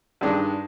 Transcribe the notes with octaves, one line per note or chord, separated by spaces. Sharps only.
G2 D#3 G#3 D4